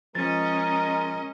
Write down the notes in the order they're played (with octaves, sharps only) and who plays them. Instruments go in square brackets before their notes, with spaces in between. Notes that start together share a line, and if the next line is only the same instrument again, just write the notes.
[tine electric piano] F3 [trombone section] G#3 A#4 [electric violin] C#4 D#5 [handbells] A6